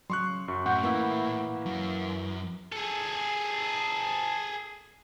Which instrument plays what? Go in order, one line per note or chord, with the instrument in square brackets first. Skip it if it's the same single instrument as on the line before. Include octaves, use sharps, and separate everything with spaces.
[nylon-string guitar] C#3 [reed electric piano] F#3 [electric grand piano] C6 C#6 F#6
[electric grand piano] F#2 [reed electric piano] C#6
[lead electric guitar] A2 [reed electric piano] F#5 C#6 G6
[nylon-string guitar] E3 E4 [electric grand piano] A#3
[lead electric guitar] F#2
[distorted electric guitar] G#4 A4